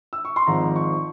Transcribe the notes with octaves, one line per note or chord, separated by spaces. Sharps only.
E6
C#6
C6
G#1 G#2 F3 A#5
C#6